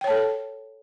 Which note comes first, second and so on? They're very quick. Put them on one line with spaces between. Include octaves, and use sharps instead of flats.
G5 C#5 A5 A4